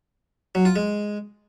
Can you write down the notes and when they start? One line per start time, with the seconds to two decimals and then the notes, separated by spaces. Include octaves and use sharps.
0.55 F#3
0.65 F4
0.76 G#3